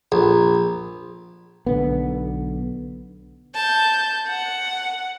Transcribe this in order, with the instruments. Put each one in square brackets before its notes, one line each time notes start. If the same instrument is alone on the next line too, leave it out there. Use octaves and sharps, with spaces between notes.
[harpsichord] A#1
[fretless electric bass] B1 D3 B3
[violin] A5 G6
F#5